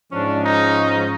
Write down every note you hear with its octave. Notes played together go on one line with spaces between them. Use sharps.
G#2 F3 G#3 C#4 D4
D#4